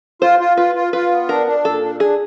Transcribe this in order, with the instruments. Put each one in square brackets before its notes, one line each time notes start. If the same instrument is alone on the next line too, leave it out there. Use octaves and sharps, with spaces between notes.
[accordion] F4 [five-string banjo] C5
[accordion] F4
[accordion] F4 [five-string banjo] B4
[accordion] F4
[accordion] F4 [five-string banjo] B4
[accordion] B3
[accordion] D4 [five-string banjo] A#4
[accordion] D4
[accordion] A#2 [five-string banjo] A4
[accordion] D4
[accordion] D4 [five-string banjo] G#4